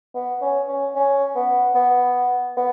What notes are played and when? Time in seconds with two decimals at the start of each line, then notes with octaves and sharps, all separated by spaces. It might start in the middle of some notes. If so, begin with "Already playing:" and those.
0.15 B3
0.42 C#4
0.68 C#4
0.95 C#4
1.36 B3
1.75 B3
2.57 B3